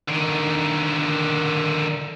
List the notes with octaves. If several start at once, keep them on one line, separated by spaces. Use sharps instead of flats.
D3 D#3